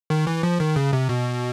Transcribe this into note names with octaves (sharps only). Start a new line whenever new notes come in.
D#3
E3
F3
D#3
C#3
C3
B2